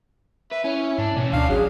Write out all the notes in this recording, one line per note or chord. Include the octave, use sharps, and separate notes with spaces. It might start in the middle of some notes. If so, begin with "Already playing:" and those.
B4 E5
C#4 E4
G#2 D4
B2 E3 C#4
D2 D4 F5
G#1 F#3 G#4